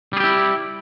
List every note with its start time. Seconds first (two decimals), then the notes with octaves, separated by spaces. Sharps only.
0.13 G3
0.17 G#4
0.20 G4
0.24 E4